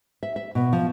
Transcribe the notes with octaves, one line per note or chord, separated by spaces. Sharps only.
E5
E5
B2
F3